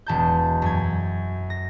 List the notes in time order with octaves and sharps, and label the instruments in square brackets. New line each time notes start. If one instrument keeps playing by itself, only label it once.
[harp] E1 A5 G6
F#2 G#6
A#6